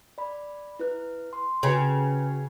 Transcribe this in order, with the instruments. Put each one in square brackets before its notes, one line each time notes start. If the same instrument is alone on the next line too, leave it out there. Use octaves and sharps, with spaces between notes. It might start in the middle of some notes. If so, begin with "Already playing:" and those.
[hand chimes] D5 B5
E4 B4 F#6
C6
[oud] C#3 [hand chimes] F#4 B4 G5